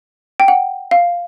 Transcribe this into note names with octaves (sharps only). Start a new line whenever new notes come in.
G5
F#5
F5